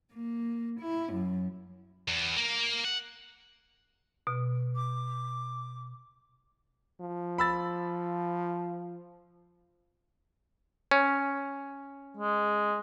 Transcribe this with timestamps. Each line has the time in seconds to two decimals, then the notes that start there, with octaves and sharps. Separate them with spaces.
0.13 A#3
0.81 E4
1.13 F#2
2.08 E2
2.36 A#3
2.85 F#5
4.27 B2
4.76 D6
7.01 F3
7.38 B5 E6 A6
10.91 C#4
12.17 G#3